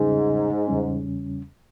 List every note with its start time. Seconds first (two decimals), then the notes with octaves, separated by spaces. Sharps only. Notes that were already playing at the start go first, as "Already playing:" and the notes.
Already playing: E2 G#2 C#3 G3 C#4
0.68 E2 C#3 G3 C#4